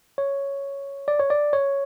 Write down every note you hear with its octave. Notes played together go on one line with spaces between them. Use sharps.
C#5
D5
C#5
D5
C#5